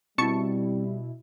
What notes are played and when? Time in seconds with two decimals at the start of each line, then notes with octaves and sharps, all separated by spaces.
0.18 B2 G3 C4 E4 A5 C#6 C#7